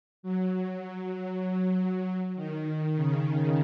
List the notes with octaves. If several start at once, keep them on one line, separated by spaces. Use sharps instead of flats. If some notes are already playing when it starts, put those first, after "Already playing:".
F#3
F#3
D#3
C#3